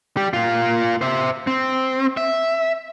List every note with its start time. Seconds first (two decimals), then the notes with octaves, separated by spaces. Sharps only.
0.17 G3 G4
0.33 A#3 F4
1.01 C5 E5
1.47 C4
2.17 E5